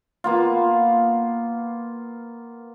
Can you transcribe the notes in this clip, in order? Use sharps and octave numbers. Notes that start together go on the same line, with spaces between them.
A#3 B3 F4